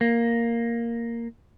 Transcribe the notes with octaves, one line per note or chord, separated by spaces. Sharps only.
A#3